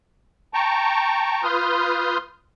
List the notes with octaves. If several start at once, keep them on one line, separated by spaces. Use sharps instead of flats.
G5 A5 A#5 C#6
F4 B4 C6 D#6 F6 G6